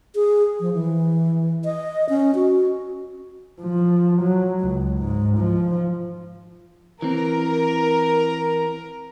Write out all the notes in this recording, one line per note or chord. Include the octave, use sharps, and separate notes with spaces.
G#4
F3
E3
D#5
C#4
F#4
F3
F#3
C#2
G#2
F3
E3 C4 A#4